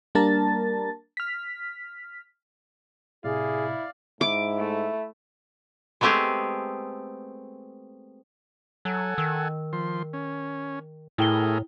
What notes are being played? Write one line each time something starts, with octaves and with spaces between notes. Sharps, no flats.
G3 A#3 D4 A#4 A5 A6
F6 B6
A2 C3 E4 G#4 D5 F5
G#2 E4 D6
A3
G#3 A3 B3 C4 G4 G#4
F#3 A4 F#5 G#5
D#3 E6
F3 C6
C#4
A2 A3 E4 G#4 A#4 G5 G7